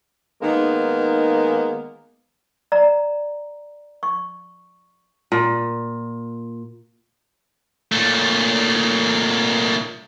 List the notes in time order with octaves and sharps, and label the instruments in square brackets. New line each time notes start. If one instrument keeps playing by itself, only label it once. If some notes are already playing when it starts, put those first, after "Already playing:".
[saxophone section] D#3 G#3 A#3 B3 D#4
[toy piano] D5 A#5
C#6
[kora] A#2
[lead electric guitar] A#2 A3